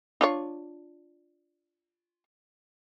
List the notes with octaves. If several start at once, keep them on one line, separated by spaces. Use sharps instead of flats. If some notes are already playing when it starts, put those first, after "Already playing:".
D4 F4 C#5